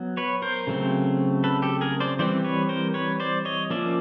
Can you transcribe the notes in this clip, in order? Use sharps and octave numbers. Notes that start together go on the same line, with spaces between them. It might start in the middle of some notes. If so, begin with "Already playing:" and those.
Already playing: F#3 B3
B4 C#5
A#4 C5
C#3 F#3 A3 C4
A4 B4
G4 A4
G#4 A#4
C5 D5
E3 G3 C4 C5 D5
B4 C#5
A#4 C5
B4 C#5
C5 D5
C#5 D#5
F3 A#3 C#4 D5 E5